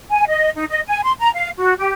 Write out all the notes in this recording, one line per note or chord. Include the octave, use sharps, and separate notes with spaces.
G#5
D#5
D#4
D#5
G#5
C6
A#5
F5
F#4
G4